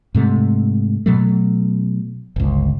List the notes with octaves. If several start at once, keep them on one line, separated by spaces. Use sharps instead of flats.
G#2 C3 A3
B2 F#3 A3
G1 C#2